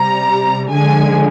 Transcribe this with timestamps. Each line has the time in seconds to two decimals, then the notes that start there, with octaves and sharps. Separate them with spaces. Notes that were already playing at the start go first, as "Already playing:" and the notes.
Already playing: C3 G3 A#5
0.70 D3 F3 G#3 G#5